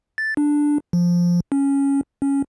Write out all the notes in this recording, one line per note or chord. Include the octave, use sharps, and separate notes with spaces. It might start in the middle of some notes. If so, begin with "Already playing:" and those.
A6
D4
F3
C#4
C#4